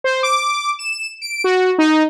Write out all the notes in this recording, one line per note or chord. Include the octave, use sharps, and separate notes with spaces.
C5
D6
E7
D7
F#4
D#4